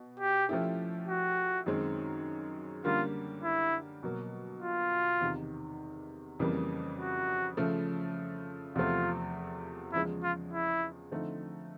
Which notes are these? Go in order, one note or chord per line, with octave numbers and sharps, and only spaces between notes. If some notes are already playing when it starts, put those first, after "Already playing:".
Already playing: B2
G4
F3 A3 C#4 E4 G4
F#4
F#2 D#3 G#3 C4
D3 G3 A#3 C#4 F4
E4
B2 F#3 A#3
F4
E2 C3 D#3
F2 C#3 E3 G3 A#3
F#4
C#3 F3 A3
E2 C3 F3 A3 C4 F4
E2 C#3 F3 G#3 E4
F4
E4
D3 F3 A3 C4 D#4